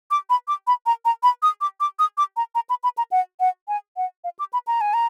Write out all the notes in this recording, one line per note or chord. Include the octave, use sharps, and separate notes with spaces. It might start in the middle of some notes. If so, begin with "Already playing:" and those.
D6
B5
D6
B5
A#5
A#5
B5
D#6
D6
D6
D#6
D6
A#5
A#5
B5
B5
A#5
F#5
F#5
G#5
F#5
F5
D6
B5
A#5
G#5
A#5